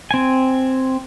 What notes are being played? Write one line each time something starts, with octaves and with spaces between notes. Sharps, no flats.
C4 G#5